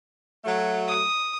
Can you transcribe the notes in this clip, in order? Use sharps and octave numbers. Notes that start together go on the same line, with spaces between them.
F#3 A3
D#6